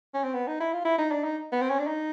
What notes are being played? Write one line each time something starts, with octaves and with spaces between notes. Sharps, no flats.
C#4
C4
B3
D#4
E4
F4
E4
D#4
D4
D#4
B3
C4
C#4
D4
D#4